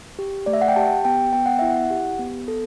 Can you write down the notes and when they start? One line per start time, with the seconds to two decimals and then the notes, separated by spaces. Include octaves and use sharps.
0.19 G4
0.46 A3 D5
0.53 E5
0.61 F#5
0.68 G5
0.76 G4 A5
1.05 B3 G5
1.33 B3 G5
1.46 F#5
1.59 E4 E5
1.70 F#5
1.90 G4
2.19 B3
2.48 A4